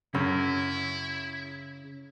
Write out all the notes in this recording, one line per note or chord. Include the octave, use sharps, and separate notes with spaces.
F#2 C#3 E4